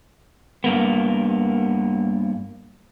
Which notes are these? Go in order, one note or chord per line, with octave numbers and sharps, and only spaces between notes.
G2 A#3 B3